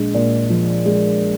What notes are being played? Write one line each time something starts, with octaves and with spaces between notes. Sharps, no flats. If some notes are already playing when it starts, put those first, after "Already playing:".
Already playing: A#1 G#3
A#2
F3
G#3